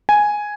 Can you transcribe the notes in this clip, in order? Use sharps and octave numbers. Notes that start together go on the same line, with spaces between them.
G#5